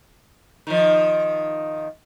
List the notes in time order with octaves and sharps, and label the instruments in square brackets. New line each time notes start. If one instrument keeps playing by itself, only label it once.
[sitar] D#3 F3